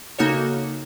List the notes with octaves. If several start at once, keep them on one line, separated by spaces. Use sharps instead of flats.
C#3 A#3 D#4 F#4 A4 C#5